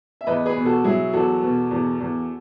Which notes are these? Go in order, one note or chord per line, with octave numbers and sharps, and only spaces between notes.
E5
E2 B4 D#5
G#4 B4
B2
F#4 A4
F#3 E4 G#4
E2 F#4 A4
B2
E2
E2